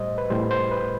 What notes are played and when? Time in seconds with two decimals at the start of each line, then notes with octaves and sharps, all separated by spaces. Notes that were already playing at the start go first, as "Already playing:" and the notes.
Already playing: A2 G3 C5 D#5
0.18 B4
0.30 A2 G3 C5
0.51 C5
0.71 B4